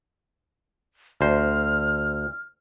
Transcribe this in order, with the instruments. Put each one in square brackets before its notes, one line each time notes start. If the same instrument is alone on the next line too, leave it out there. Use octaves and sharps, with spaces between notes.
[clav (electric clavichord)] D2 C5 [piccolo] F6